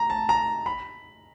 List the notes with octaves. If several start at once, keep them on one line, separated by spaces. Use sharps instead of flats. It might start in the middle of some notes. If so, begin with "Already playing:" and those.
Already playing: A#5
A5
A#5
B5